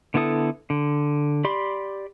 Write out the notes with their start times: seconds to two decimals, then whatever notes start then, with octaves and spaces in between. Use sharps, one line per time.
0.14 D3 B3 E4 A4 D#6
0.70 D3
1.44 G4 D5 B5 C6